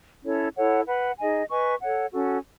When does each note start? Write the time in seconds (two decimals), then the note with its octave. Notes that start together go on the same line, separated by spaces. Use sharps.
0.23 C#4 E4 A4 C#5
0.55 E4 A4 C#5 F#5
0.86 B4 F#5 B5
1.18 D#4 G#4 D#5 G#5
1.49 B4 D#5 G#5 C#6
1.81 A4 C#5 F#5
2.12 C#4 F#4 A4